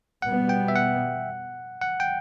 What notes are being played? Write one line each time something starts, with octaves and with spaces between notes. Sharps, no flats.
B2 G3 B3 F#5
G5
E5
F#5
F#5
G5